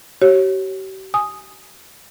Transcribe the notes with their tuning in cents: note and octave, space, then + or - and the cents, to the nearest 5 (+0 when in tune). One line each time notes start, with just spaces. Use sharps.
G4 -45 C#5 -20
G#5 +5 D#6 +0